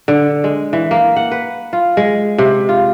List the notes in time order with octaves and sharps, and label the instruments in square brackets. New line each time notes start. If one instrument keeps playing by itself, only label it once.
[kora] D3
G#3
E3
A#3
F#5
B4
F4
G#3
C3
F4